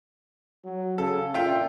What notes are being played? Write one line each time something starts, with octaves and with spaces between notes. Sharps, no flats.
F#3
C#3 A4
A#2 F4 E5 G5